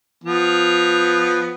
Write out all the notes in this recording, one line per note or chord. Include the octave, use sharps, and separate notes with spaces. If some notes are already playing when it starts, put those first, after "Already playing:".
F3 B3